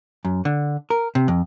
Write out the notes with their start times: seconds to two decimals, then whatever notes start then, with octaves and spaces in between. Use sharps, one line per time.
0.25 F#2
0.45 D3
0.90 A#4
1.15 C3
1.28 F2